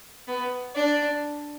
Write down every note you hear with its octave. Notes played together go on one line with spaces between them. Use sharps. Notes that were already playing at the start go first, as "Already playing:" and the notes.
B3
D4